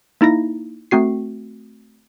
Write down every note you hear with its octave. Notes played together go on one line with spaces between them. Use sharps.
A#3 D#4 E4 A#6
A3 C4 F#4 C7